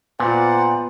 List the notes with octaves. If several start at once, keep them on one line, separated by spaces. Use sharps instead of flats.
A#2 B3 F4 C5 D5 F#5